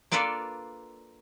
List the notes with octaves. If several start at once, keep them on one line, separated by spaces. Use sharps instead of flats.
A#3 D4 F4 A4 B4 D5